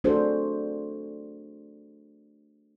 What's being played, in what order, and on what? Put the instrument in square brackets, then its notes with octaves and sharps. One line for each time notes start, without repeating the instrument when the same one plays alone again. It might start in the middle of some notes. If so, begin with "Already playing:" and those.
[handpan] A3 D4 F#4 G#4 A4 C5